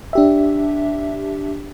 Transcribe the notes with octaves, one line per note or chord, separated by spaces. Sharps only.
D4 G4 E5